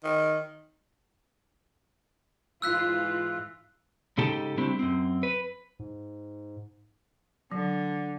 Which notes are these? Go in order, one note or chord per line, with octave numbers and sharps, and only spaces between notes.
D#3
G#2 E3 F4 E6 F#6 B6
G#2 C#3 D#4 G4 A4 A5
G3 A3 C4 D4 E4 G4
F#2 C4
B4
G#2
D3 F#3